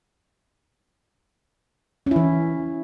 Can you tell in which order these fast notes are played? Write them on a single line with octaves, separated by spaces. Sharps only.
C#4 E4 E3